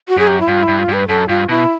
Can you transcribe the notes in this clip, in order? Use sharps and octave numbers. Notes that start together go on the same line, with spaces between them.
F#4
F#2 G#4
G4
E4
G2 F4
E4
G2
F4
G2 B4
F#2 A4
G2 F4
B2 E4